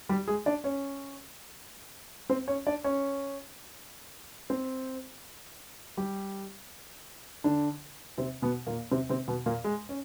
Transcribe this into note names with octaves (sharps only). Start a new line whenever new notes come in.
G3 G4
G#3 G#4
D4 D5
C#4 C#5
C4 C5
C#4 C#5
D4 D5
C#4 C#5
C4 C5
G3 G4
D3 D4
C3 C4
B2 B3
A#2 A#3
C3 C4
C3 C4
B2 B3
A#2 A#3
G#3
C#4